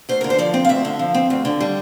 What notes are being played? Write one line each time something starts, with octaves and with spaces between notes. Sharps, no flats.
D2 C5
D3 A#4
C5
F3 D5
C4
F5
D2 E5
D3
F3
C4
D2
D3
G3